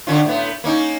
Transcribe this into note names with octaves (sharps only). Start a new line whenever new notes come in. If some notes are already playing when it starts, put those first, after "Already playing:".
D3 C#4 F4
A2 B3
A#3 C#4 D#4